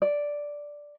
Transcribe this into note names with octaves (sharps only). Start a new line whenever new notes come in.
D5